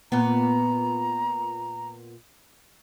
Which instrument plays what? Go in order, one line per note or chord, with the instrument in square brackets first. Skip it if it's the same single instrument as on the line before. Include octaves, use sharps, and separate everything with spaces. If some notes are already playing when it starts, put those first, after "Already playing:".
[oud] A#2 B3 [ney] A#5